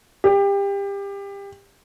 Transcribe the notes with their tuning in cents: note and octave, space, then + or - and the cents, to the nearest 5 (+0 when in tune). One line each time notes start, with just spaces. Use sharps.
G4 +25